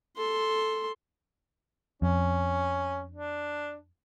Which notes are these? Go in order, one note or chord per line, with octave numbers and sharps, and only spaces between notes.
A4 C6
F2 C#4
D4